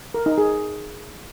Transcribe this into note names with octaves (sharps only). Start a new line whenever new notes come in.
A#4
D#4
G#4